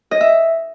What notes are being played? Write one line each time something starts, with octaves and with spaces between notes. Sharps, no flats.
D#5
E5